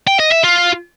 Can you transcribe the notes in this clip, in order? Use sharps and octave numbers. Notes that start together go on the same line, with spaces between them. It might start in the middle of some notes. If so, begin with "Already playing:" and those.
G5
D#5
E5
F4